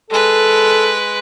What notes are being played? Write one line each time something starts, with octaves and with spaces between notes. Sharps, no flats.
G#3 A4 B4